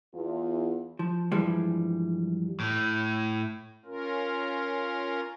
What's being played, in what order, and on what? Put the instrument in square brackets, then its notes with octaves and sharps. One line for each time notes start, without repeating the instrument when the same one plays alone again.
[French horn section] E2 F4
[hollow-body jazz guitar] F3
G2 E3 F3 G3 G#3
[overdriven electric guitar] A2
[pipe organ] C#4 F4 A#4